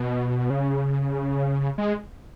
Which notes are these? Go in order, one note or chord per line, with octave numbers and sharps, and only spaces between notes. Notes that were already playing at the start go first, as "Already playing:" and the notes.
Already playing: B2
C#3
G#3